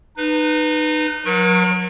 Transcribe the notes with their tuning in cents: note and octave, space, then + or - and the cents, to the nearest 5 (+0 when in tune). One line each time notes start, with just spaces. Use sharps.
D#4 -25 B4 +0
F#3 -25 A#4 +40 C#6 -45